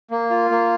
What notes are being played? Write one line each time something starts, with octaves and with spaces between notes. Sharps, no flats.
A#3
F4
A#3